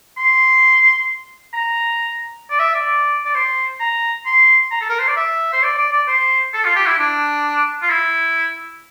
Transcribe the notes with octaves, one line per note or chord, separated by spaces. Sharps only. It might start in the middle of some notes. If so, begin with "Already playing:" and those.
C6
A#5
D5
E5
D5
D5
C5
A#5
C6
A#5
A4
A#4
C5
D5
E5
C5
D5
D5
D5
C5
A4
F4
G4
E4
D4
F4
E4